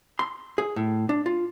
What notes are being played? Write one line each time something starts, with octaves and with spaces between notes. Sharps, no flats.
C6
G#4
A2
D4
F4